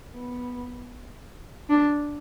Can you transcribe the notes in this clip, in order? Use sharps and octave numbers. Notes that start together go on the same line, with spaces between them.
B3
D4